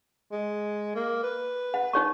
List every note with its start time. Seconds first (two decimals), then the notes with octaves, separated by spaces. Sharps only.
0.32 G#3
0.96 A#3
1.23 B4
1.74 F#5
1.93 D#4 C#5 C#6